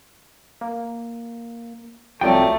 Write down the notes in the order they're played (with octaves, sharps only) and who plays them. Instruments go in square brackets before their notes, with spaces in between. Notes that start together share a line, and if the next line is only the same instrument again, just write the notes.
[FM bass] A#3
[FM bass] C2 [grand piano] F3 F#3 D5 [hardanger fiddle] A3 [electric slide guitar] C4 F4 G5